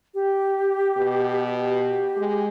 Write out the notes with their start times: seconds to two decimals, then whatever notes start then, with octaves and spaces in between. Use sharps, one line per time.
0.14 G4
0.97 B2
1.57 G4
2.17 G#3